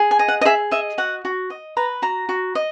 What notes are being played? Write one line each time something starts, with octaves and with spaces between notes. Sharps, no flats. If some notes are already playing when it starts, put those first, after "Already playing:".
Already playing: G#4
G#5
D#5
F#5
D#5
G#4 E5
D#5 E5
F#4 F#5
F#4
D#5
B4 A#5
F#4 A#5
F#4
D#5